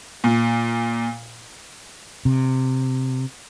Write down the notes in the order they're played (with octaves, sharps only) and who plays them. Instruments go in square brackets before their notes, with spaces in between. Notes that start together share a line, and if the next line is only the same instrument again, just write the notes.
[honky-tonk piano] A#2
[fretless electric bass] C3